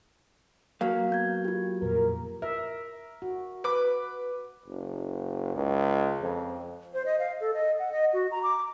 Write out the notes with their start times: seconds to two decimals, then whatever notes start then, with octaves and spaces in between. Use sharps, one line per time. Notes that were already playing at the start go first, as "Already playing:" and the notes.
0.81 F#3 A#3 F5
1.10 B3 G6 G#6
1.45 F4 G4
1.82 F2 A#2 A#4
2.42 A#4 E5
3.22 F#4
3.64 B4 D6
4.66 F#1
5.54 C#2
6.22 F2
6.93 C5
7.06 D#5
7.19 F5
7.40 A4
7.54 D#5
7.79 F#5
7.92 D#5
8.13 F#4
8.31 A#5
8.43 D6